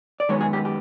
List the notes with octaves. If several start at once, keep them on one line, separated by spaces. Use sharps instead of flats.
D5
F#2 D#3 G#3 B3 C#5
G#4
G4
G4